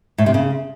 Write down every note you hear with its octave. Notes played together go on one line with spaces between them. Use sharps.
A2
C3
C#3